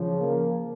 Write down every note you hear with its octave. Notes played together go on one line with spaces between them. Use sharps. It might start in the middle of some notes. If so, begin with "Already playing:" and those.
Already playing: C#3 F3
A#3